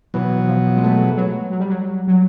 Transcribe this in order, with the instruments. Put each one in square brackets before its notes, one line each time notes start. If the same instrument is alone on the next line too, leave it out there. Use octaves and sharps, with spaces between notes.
[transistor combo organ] B2 F#3 B3 [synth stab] E3
[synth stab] F3
G#3
A3
F#3
F#3
G3
F#3
F#3